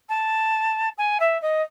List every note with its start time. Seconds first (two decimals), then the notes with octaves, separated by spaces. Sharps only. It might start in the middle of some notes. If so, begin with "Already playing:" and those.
0.09 A5
0.98 G#5
1.20 E5
1.42 D#5